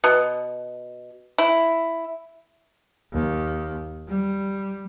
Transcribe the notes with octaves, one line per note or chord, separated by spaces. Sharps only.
B2
E4
D#2
G3